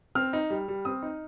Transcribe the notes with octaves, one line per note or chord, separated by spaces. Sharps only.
C4 F6
D#4
G3
G3
C4 D#6
D#4